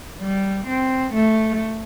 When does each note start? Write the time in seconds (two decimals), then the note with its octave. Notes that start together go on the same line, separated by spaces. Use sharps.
0.21 G3
0.67 C4
1.14 A3